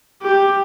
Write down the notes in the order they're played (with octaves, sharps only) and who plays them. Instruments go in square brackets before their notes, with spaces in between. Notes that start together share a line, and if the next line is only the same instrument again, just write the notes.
[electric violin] G4